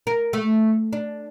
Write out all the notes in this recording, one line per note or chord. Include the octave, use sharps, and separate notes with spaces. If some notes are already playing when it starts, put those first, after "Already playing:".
A#4
A3
D4